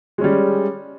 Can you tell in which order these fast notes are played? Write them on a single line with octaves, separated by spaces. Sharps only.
G#3 C#4 G3